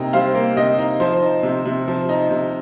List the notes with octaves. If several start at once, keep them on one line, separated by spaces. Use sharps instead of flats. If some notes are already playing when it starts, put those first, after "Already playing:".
Already playing: C3 A#3 D#4 D#5 G5
G3 C5 F5
A#3
C3 D#5
D#4
F3 C5
D#4
C3
C3
F3
D#4
C3